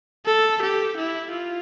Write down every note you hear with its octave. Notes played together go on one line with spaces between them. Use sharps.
A4
G4
E4
F4